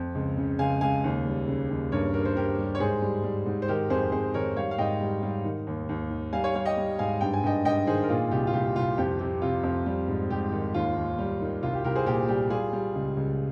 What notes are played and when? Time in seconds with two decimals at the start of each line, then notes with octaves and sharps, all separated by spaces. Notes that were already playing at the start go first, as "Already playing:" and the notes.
Already playing: F2
0.15 C#2
0.37 C#3
0.59 C#2 F5 G#5
0.81 C#2 F5 G#5
1.04 D#2
1.26 G3
1.48 C#3
1.70 D#2
1.92 G2 A#4 C#5
2.14 G2 A#4
2.25 C5
2.36 G2 G4 A#4
2.58 G3
2.75 C#5
2.80 G#2 G#4 C5
3.02 G3
3.24 G3
3.46 G#2
3.62 C5
3.68 D#3 G4 A#4
3.90 F2 G#4 C5
4.12 F2 G#4 C5
4.34 D#3 A#4 C#5
4.56 G3 C#5 F5
4.71 F5
4.78 G#2 D#5 G5
5.01 G3
5.23 G3
5.44 D#3
5.67 D#2
5.89 D#2
6.11 D#3
6.33 G3 F5 G#5
6.44 C#5 F5
6.55 G3 C#5 F5
6.66 D#5 G5
6.77 G3
6.99 G#2 F5 G#5
7.21 G2 G5
7.34 G#5
7.43 G2 D#5 G5
7.65 G2 D#5 G5
7.87 D#3 G#4 C5
8.03 A#4
8.09 A#2 F4 G#4
8.31 C2 G4
8.47 F4
8.53 C2 G4
8.76 C2 F4
8.98 F2 G4
9.20 C3 G4
9.42 C3 F4
9.63 F2
9.86 G3
10.08 G#2
10.30 G#2 G4
10.52 D#3
10.74 D#2 F4
10.96 D#2
11.18 G3
11.41 D#3
11.63 C2 F4
11.73 G4
11.84 C2 G4 A#4
11.95 G#4 C5
12.06 A#2 G4 A#4
12.28 G3 G4
12.50 G3 F4 G#4
12.73 G3
12.95 C#2
13.17 C#2